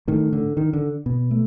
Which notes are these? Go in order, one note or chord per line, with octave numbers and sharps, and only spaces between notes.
A2 D#3
D3
D#3
D3
B2
A3